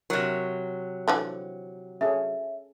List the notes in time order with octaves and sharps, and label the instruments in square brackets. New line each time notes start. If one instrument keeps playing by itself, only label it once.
[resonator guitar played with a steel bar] C3 F#3 [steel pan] A#4
[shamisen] D3 E3 F3
[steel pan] C#4 G#4 A4 [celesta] E5